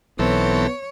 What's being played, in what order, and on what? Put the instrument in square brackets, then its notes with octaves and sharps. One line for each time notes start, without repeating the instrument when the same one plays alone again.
[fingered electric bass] B1 [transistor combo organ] E3 C4 A4 [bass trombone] B3 [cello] C#5